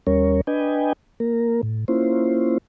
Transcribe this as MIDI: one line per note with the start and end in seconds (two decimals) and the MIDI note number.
0.07 0.41 39
0.07 0.41 55
0.07 0.41 61
0.07 0.41 70
0.07 0.41 73
0.47 0.93 62
0.47 0.93 71
0.47 0.93 75
0.47 0.93 79
0.47 0.93 80
1.20 1.61 58
1.20 1.61 70
1.63 1.85 45
1.88 2.58 58
1.88 2.58 61
1.88 2.58 64
1.88 2.58 65
1.88 2.58 72